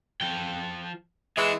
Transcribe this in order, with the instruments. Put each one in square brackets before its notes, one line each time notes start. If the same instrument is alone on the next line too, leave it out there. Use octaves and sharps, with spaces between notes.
[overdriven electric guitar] F3 G5
[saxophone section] E3 G#3 [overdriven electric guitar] B3 E4